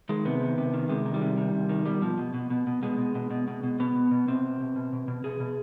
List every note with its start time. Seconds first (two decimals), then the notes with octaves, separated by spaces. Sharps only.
0.09 D#3 G#3
0.25 C3 B3
0.41 D#3
0.58 C3
0.74 D#3
0.89 C3 G#3
1.06 D#3
1.14 G3
1.22 C3
1.37 D#3
1.53 C3
1.69 D#3
1.86 B2 G3
2.02 B2 F3
2.18 B2
2.34 B2
2.50 B2
2.67 B2
2.83 B2 G#3
2.98 B2
3.15 B2
3.30 B2
3.48 B2
3.64 B2
3.80 B2 B3
3.95 B2
4.11 B2
4.28 B2 C4
4.43 B2
4.61 B2
4.76 B2
4.93 B2
5.08 B2
5.24 B2 G#4
5.40 B2